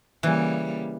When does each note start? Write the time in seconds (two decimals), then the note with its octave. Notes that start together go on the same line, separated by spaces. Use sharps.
0.23 C#3 E3 G3 A#3